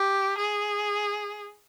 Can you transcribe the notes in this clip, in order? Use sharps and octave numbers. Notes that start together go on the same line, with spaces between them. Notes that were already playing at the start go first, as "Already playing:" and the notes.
Already playing: G4
G#4